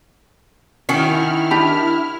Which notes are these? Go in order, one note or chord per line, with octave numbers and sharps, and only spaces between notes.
D#3 C#4 E4 F#4 F6
D4 G4 B5 B6 F7